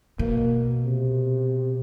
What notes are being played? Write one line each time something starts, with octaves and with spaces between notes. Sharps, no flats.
B2 A#3
C3